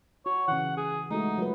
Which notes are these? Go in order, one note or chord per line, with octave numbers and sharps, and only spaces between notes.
F#4 C#5
C#3 E3 F#5
G#4
G#3 A3 D#4 F#4
F#3 F4 B4